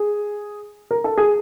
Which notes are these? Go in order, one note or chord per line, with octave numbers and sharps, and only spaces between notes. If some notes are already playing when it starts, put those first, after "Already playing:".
Already playing: G#4
A#4
A4
G#4